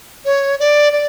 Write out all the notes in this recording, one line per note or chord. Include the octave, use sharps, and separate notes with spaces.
C#5
D5
D5